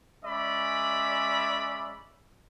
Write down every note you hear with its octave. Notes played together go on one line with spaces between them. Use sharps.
G#3 C#4 D5 E5 B5